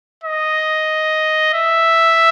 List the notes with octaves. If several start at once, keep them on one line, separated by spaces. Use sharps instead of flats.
D#5
E5